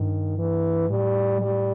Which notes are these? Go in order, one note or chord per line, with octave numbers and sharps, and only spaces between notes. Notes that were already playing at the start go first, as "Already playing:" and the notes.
Already playing: G2 D#3
E3
A2 G3
G3